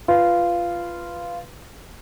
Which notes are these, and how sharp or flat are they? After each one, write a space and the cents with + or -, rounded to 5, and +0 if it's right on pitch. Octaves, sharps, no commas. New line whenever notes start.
F4 -10 B4 +0